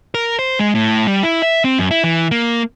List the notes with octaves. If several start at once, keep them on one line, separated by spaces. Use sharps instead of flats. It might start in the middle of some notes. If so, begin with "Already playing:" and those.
A#4
C5
G#3
A2
G3
E4
E5
C4
F#2
E4
E3
A#3